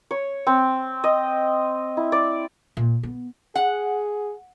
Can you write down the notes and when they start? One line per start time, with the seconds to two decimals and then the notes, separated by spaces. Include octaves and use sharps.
0.11 C#5
0.47 C4
1.04 D#5
1.97 E4
2.12 D5
2.77 A#2
3.03 B3
3.55 G#4 F#5